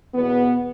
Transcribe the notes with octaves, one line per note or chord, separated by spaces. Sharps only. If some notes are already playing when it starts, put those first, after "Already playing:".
E2 B2 B3